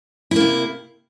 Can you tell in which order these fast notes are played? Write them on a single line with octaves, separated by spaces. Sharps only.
E4 A#3 C3